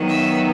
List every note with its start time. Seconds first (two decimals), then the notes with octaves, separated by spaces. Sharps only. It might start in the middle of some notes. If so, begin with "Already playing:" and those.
Already playing: D#3 F#3 B3
0.09 E5